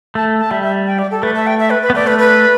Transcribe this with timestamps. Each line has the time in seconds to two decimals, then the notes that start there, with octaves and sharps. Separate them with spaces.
0.15 A3 A5
0.40 A5
0.51 G3 E5
0.63 E5
0.87 G5
0.99 D5
1.11 A4
1.23 A3 B4
1.35 E5
1.47 G5
1.59 E5
1.70 B4
1.82 B4
1.90 B3
1.95 A3 D5
2.07 B4
2.19 B4